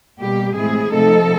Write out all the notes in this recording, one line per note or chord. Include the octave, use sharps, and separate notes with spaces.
B2 G3 A#3 G4
A2 E3 G#3 C4 E4 G#4
C3 F3 A3 C4 D#4 A4